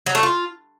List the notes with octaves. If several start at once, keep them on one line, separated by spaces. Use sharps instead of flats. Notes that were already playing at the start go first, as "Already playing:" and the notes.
F#3
A3
F4